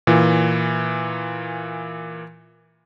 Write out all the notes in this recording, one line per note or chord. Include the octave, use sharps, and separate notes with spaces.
A#2 E3